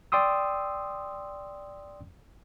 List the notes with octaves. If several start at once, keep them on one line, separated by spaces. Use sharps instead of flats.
D5 G5 C6 D#6 E6